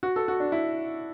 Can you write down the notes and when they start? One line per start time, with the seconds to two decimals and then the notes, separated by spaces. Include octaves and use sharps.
0.03 F#4
0.16 A4
0.28 F#4
0.40 D4
0.52 E4